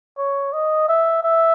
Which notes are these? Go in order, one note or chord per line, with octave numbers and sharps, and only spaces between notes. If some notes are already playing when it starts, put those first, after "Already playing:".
C#5
D#5
E5
E5